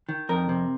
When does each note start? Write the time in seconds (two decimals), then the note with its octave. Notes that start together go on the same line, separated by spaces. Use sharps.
0.09 D#3
0.29 F2 A#4
0.49 C3